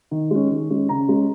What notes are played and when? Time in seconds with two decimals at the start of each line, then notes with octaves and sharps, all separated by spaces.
0.11 D#3
0.31 G#3 C#4
0.51 D#3
0.70 G#3 C#4
0.89 C#3 A#5
1.09 G#3 C#4